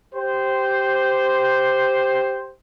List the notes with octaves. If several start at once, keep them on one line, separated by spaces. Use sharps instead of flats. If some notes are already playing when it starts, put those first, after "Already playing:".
G4 C5